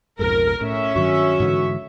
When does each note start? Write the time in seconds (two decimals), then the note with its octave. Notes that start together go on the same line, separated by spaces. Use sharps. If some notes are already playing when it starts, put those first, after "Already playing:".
0.19 B1 F2 G#2 A#4
0.61 A2 C#4 E5
0.96 G2 D#3 F#3 F#4
1.40 G#2 D3 E3